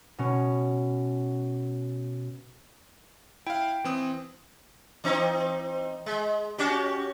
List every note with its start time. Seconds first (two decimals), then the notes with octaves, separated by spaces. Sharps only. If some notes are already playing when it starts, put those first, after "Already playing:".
0.18 B2 C#4
3.47 E4 F5 G5
3.84 E3 C4 D#6
5.04 E3 C4 D#4
6.06 G#3
6.58 C#4 F#4 G4